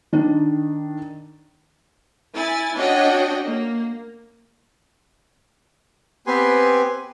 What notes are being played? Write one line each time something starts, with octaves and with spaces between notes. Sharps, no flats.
D#3 D4
E4 G#5 A6
C#4 D4 F#4 C#5 D#5 G5
A#3
B3 C4 G4 B4 G#5 C6